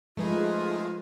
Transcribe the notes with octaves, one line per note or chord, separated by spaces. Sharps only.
F3 G#3 A3 D#4 F4 G#4 B4